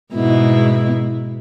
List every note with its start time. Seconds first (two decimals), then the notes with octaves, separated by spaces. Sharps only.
0.14 G#2 B2 E4